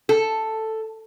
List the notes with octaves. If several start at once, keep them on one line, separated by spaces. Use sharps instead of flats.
A4